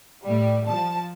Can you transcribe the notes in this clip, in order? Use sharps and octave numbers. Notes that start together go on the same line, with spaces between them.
A2 G3
F3 A5